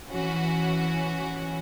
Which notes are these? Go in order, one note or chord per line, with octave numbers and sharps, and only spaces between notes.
E3 C#4 F#4